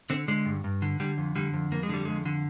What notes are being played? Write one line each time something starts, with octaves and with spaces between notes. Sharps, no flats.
D3 C4
D3 G#3
G2
G2
D3
D3 G3
F2
D3 G3
F2
F2 A#3
G#3
D3 G3
F2 G#3
D3